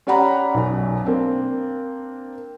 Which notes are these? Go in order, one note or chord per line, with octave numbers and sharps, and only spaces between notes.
C#4 G4 D5 F#5 A#5 B5
B1 F#2
A#3 C4 D4